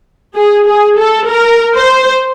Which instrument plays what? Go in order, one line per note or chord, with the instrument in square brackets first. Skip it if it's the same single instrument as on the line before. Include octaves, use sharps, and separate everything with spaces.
[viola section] G#4
G#4
A4
A#4
C5